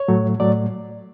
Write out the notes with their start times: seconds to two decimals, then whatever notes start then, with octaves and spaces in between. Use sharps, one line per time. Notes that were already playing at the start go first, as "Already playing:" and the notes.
Already playing: C#5
0.08 A2 F#3 A3
0.40 A2 F#3 A3 D5